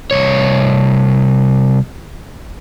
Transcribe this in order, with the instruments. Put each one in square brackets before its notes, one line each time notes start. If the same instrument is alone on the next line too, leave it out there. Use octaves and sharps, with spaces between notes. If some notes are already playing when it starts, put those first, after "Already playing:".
[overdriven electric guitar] C2 C#5